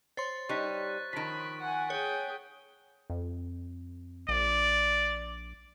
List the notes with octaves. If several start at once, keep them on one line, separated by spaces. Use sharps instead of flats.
C5 C#5 C6 A6
G3 D#4 C#6 F#6 B6
D#3 F3 B5 B6 D7
F#5 G#5
G#4 C#5 G5
F2
A#1 D5